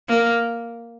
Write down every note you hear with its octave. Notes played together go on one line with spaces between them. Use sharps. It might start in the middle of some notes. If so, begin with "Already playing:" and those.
A#3